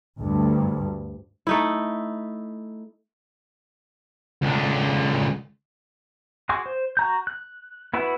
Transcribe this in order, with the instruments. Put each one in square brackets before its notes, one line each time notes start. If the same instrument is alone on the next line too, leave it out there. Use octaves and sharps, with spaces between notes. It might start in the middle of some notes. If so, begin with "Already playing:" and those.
[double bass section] D2 G2
[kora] A3 D#4 E4
[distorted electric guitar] C#2 D3
[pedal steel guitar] F#4 G#4 C6 D6
C5
F#4 A#5 G6
F#6
B3 E4 F#4 B4 F#5